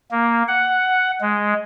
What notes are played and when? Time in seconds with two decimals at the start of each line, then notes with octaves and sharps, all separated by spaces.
0.11 A#3
0.48 F#5
1.21 G#3